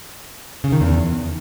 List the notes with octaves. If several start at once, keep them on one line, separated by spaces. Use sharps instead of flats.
C#3
D#3
E2